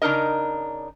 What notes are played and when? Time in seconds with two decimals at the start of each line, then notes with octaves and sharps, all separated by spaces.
0.02 C#3 D4 D#4 A#4 D#5